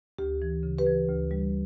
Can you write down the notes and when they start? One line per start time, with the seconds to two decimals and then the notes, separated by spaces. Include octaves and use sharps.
0.18 D2 G4
0.42 E3
0.63 C#3
0.78 G4 B4
0.87 E3
1.08 D2
1.31 G3